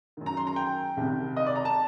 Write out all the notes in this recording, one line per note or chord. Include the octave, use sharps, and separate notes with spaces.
F#2 D#3
A#5
C6
A#5
G5
C2 C3 D#3
D#5
D5
A#5
A5